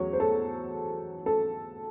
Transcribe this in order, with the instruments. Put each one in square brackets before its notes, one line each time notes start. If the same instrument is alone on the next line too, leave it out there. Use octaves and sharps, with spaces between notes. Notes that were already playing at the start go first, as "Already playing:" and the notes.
Already playing: [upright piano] E2 F#3 C#5
C5
A4
A4